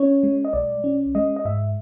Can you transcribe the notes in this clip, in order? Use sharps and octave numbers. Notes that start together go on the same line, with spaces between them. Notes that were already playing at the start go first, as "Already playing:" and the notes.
Already playing: C#4 C#5
G#3
D#5
B1 D5
C#4
G#3 D#5
D#5
G#2 E5